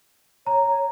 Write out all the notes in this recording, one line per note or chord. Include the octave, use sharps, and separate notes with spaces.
C#5 A#5